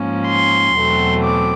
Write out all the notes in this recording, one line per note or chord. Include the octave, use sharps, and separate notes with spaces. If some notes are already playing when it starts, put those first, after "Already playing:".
Already playing: G#2 F3 A#3 C#4
C6
E2 B2 F#3 A3 C4
D6